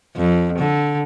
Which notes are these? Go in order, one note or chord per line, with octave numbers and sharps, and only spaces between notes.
F2
D3